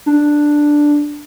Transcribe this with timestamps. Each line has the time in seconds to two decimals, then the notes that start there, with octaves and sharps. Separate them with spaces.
0.06 D4